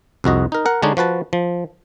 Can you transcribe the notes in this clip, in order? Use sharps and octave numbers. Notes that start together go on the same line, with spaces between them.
C2 F2 F#4 D#5
D#4 A#4
A#4 F#5
D3 G#3 D4 D#4 C#5
F3 F#4 B4 A5
F3